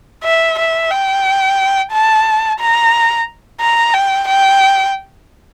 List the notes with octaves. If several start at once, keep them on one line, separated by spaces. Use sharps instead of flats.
E5
E5
G5
A5
A#5
A#5
G5
G5